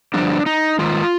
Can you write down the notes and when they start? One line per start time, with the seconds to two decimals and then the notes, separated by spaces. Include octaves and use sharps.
0.14 G2 D3 F3 D4
0.46 D#4
0.79 G#2 D#3 F4